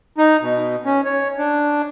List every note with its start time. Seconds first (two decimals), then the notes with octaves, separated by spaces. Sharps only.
0.18 D#4
0.41 B2
0.85 C#4
1.05 C#5
1.38 D4